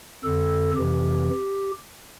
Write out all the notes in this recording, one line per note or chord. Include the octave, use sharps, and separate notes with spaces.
F2 D3 A4
F2 C3 E3 G4